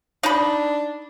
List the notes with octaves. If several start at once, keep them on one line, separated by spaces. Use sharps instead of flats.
D4 D#4 B5